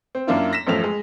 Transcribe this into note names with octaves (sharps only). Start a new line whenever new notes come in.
C4
F#2 A#3 D4 E4 F4
A#6 B6 E7
A1 F#2 F3 A3 F7
G#3